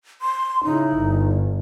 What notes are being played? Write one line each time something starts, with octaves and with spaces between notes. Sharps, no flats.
C6
C#3 D#4 E4
G1